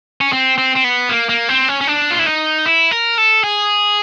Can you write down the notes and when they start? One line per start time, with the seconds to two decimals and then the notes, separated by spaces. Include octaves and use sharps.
0.21 C#4
0.33 C4
0.58 C4
0.76 C4
0.84 B3
1.09 A#3
1.29 A#3
1.49 C4
1.68 C#4
1.81 C#4
1.87 D4
2.11 F4
2.19 E4
2.26 D#4
2.66 E4
2.91 A#4
3.18 A4
3.44 G#4